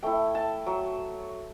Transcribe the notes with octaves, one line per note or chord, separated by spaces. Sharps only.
A3 E4 G5
A5
F#3